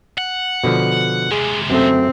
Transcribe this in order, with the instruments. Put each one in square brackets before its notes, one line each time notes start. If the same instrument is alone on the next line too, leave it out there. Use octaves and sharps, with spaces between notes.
[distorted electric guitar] F#5
[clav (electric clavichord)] B2 D3 F3
[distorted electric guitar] C3 G#3 [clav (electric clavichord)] G#4
[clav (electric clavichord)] F#2 A3 [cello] C4